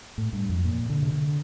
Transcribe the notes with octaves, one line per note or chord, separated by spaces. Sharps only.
A2
G2
F2
A#2
D3
C3
D3